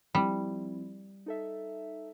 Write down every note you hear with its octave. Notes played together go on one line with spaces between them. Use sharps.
F3 G3 C4 E4
D#4 A4 E5